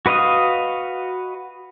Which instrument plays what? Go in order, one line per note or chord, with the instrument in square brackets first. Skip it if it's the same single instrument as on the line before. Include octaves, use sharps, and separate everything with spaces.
[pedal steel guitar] F#4 B4 D#5 F5 D#6